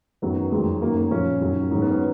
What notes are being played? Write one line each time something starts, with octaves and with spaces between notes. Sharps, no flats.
F#2 D#3 F#3 B3
F2 D#3 F#3 G#3
F#2 D#3 F#3 A#3
A#3
A#2 F3 C#4
F#2 D#3 F#3
G#2 D#3 F#3
B3
C#4